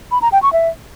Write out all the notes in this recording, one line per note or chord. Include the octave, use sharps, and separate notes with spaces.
B5
A#5
G5
C#6
E5